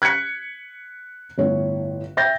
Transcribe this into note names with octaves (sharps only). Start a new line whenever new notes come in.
F#6 G#6 B6 C#7
G1 A2 C#5
E5 G5 G6 A6 A#6